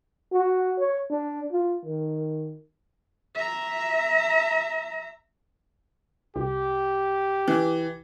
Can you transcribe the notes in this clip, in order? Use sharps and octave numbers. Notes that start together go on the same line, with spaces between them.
F#4
C#5
D4
F4
D#3
E5 A#5
C2 G4
E3